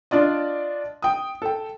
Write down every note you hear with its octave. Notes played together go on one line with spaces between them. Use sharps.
D4 F4 D5 D#5
G5 D#6
A4 G5